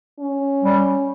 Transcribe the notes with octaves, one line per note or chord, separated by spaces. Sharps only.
C#4
G3